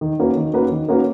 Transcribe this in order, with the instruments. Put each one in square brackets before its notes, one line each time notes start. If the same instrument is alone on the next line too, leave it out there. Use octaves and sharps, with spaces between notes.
[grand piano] D#3
A#3 C#4 F#4 B4
D#3
A#3 C#4 F#4 B4
D#3
A#3 C#4 F#4 B4